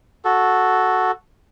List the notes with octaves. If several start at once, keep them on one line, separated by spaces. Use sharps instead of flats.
F#4 A4